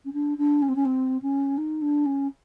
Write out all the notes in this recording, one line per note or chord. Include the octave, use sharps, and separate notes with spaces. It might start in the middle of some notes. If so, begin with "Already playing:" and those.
C#4
D4
D4
C#4
C4
C#4
C4
C#4
D#4
D4
C#4